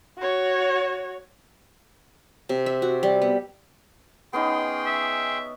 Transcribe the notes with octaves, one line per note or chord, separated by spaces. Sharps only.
F#4 C#5
C3
E5
F#4
G3
B3
B3 C#4 D#4 G#4 G5 C6
E5